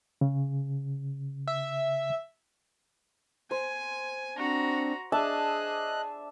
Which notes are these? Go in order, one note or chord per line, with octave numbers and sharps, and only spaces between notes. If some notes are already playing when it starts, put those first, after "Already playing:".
C#3
E5
C5 G#5
C4 D4 F#4 A#5
D4 G#4 D#5 E5 A5 F#6